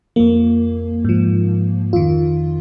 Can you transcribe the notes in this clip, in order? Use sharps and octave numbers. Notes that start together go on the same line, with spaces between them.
F2 F3 A#3
G#2 F3
F2 D#3 F4